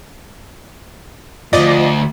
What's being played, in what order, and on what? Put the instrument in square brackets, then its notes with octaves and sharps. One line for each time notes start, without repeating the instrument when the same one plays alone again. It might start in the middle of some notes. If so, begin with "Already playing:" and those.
[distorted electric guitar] D2 G#2 [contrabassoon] F3 [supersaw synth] D5 D#5